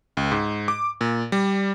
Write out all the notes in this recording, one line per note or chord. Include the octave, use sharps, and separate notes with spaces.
C#2
G#2
D6
A#2
G3